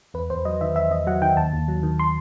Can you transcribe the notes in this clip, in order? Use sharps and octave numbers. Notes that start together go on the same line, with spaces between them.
E2 B4
E2 C5
F#3 D#5
D#3 E5
E2 E5
E2 D#5
F#3 F#5
D#3 G5
D#2 A5
D#2
F#3
D#3
C6